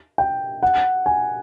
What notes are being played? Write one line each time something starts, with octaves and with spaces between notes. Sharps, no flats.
G5
F#5
G#5